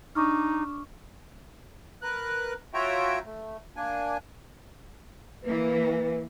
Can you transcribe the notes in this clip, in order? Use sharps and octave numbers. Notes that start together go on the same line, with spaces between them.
D4 D#4 C#6 D6 F6
A#4 B4 F#6
F4 F#4 C#5 E5 G5 A#5
A3
A#3 D4 G#5
E3 A#3 B4